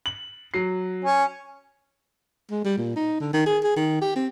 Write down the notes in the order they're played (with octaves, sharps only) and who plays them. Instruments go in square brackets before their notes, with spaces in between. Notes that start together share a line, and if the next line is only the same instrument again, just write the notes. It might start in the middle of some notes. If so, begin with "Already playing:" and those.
[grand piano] F#7
F#3 C7
[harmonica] C#4
[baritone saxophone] G#3
G3
A#2
D#4
D3
D#3
G#4
G#4
D#3
G4
C4